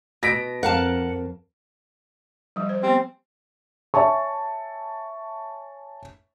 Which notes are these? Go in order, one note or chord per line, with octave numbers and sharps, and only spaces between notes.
B2 A#6 B6 D7
F2 A#4 F5 F#5 A5
F3 G3
C5
B3 C4 G4
C#5 E5 G#5 A5 C#6